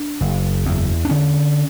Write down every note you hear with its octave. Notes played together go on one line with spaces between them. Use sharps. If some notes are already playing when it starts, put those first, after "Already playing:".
Already playing: D4
F#1
E2
D4
D3 C#4